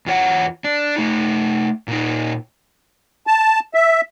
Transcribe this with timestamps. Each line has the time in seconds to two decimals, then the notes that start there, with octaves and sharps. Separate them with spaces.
0.06 E2 F4 C#5 F#5
0.64 D4
0.96 A3 D#4
1.88 A#2 D#4
3.27 A5
3.74 E5